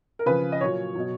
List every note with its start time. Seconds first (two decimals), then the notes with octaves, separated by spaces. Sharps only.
0.19 A#4
0.26 C#3 F3 B4
0.52 D#5
0.61 A#2 F#3 C#5
0.95 B2 F#3